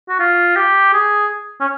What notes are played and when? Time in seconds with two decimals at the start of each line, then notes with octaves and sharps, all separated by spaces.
0.09 F#4
0.19 F4
0.56 G4
0.93 G#4
1.60 C#4